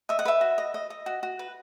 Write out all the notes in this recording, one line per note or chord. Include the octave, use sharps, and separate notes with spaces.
D#5 E5
F#5
B4 E5
F#4
D#5
D#5
D#5
F#4
F#4
B4